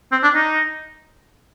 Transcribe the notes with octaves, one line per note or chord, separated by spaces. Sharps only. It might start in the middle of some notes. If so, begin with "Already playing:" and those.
C4
D4
D#4